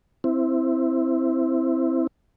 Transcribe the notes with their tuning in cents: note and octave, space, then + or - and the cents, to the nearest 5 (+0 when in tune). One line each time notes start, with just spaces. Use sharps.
C4 +0 E4 +0